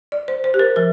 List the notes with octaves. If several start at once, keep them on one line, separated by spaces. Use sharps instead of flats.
D5
C5
C5
G4
A#4
F3 A#4